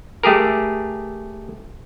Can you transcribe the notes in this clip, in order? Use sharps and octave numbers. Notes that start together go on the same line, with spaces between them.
A3 G4 G#4 A#4